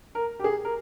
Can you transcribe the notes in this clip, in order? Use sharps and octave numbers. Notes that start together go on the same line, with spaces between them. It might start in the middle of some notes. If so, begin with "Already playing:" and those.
A#4
G4
G#4
A#4